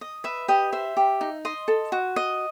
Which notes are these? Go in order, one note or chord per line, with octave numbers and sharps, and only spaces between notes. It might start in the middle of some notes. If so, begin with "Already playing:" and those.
D#5
B4 E5
G4 D#5
C5 E5
G4
D#4
D#5 C6
A4
F#4
D#5